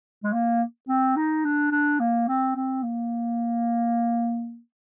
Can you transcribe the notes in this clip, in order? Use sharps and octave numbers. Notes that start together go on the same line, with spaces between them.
G#3
A#3
C4
D#4
D4
D4
A#3
C4
C4
A#3